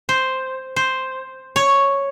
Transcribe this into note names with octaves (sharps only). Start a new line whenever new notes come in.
C5
C5
C#5